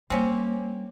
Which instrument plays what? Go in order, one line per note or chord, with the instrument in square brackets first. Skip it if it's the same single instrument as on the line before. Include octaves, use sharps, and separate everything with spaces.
[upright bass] G3 [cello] A#3 [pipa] C4 C#4 G4